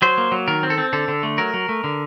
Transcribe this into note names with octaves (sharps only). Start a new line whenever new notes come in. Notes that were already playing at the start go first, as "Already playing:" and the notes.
F#3 C5
A#3
F#3
D#3 A#4
C4
A4
C4
D3 A4
D3
A3
F#3 A#4
F#3
A3
D3